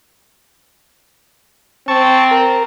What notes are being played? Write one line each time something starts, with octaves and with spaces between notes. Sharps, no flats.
C4 A5 C#6
A#4